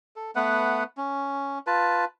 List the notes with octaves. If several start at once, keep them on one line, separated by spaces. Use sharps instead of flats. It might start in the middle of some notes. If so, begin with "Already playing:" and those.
A4
A3 B3 B4 F#5
C#4
F4 B4 A5